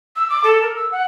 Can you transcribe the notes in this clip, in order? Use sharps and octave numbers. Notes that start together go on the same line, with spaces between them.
E6
D6
A4
A#4
E6
F#5